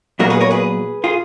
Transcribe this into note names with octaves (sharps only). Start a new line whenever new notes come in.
A#2 F#3 B3 F#4 A#4
G#4 B4
A#4 C#5
G#4 B4
F4 G#4